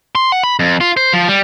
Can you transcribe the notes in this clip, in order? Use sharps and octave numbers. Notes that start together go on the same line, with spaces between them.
C6
F#5
B5
F2
F4
C5
F3
G3